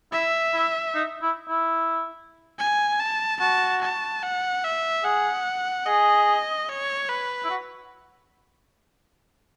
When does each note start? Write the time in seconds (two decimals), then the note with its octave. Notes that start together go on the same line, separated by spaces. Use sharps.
0.12 E4 E5
0.54 E4
0.95 D#4
1.22 E4
1.49 E4
2.59 G#5
3.00 A5
3.40 F#4 A5
3.81 A5
4.23 F#5
4.64 E5
5.04 G#4 F#5
5.86 G#4 D#5
6.69 C#5
7.09 B4
7.44 E4
7.50 F#4